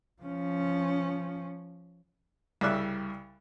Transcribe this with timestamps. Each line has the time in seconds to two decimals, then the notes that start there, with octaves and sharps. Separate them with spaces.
0.22 F3 C#4
2.61 C2 C#3 G3 D5 E5 F#6